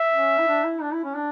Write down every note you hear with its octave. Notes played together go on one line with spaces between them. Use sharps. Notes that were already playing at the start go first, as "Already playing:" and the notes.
Already playing: E5
C#4
E4
D4
E4
D4
E4
C#4
D4